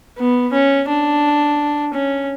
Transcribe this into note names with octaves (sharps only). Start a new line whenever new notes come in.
B3
C#4
D4
C#4